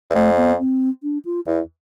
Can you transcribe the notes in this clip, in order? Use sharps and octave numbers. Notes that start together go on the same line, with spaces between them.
E2
F2 A3
B3
C4
D4
F4
E2 E4